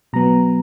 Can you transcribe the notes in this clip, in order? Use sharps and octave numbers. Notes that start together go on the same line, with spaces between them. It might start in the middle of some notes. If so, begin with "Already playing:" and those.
B2 F#3 B3 A#5